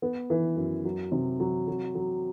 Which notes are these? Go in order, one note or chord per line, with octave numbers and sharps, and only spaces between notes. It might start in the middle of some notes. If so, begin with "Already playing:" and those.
B3
E3
F#2
F#3
C3
F#3
F#3
F#3